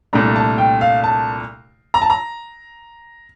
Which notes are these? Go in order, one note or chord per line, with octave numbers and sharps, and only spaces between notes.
C2 A#2 A3 D4 A#5
A5
G5
F5
A5
A#5
A5
A#5